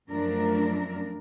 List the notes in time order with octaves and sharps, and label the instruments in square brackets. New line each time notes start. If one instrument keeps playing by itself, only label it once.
[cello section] F#2 F3 A3 D4 A#4